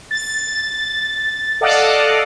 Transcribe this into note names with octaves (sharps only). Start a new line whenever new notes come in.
A6
A4 D5 D#5 F5 F#5